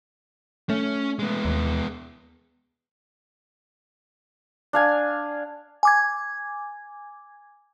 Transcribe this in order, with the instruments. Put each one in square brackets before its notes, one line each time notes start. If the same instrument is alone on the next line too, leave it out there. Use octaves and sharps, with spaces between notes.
[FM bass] A3 [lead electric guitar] C#4
[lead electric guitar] G#3 B3
[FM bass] D#2
[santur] D4 F5 G#5
[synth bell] G#5 D6 G#6